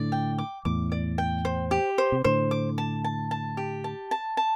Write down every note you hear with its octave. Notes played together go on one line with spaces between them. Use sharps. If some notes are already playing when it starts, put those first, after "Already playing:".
Already playing: A2 D3 D5
G5
D6
E2 A2 D6
D5
G5
C5
G4
C5
C3
A2 D3 C5
D6
A5
A5
A5
G4
A5
A5
A5